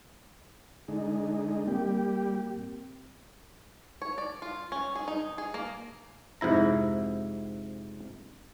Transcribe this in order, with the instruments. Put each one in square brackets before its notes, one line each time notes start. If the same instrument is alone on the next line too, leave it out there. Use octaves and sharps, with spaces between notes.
[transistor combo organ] D3 G#3 D#4
[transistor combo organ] G3 G4 [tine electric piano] A#3 C4 A#4
[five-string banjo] C#5
D5
F4
C#4
G#4
D#4
G#4
A#3
[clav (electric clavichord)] F2 G#2 C3 E4 A#5